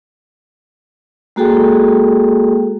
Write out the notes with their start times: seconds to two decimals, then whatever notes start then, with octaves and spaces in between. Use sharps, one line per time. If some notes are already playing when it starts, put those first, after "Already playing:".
1.36 G#3 A#3 F#4 G#4 A4 G5